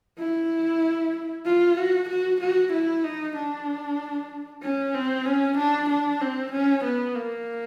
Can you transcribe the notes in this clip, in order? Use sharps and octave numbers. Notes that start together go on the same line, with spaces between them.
E4
F4
F#4
F#4
F#4
E4
D#4
D4
C#4
C4
C#4
D4
D4
C4
C#4
B3
A#3